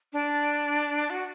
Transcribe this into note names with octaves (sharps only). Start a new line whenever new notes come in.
D4
F#4